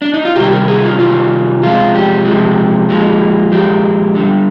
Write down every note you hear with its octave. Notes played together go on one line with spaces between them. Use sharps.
D4
D#4
F4
C3 D#3 G3 G4
A#4
G#4
F4
C3 D#3 G3 F4
C3 F3 G#3 F4
G4
C3 F3 G#3
A#2 F3 G#3
A#2 F3 G#3 G4
D3 G3